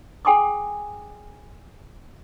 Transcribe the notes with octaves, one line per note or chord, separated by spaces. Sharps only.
G#4 G5 G#5 C6 D6 D#6